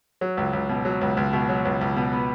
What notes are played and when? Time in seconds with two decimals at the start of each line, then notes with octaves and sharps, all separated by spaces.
0.21 F#3
0.37 C#2
0.53 C#2
0.69 B2
0.85 F#3
1.01 C#2
1.17 C#2
1.33 B2
1.49 F#3
1.65 C#2
1.81 C#2
1.96 B2
2.13 B3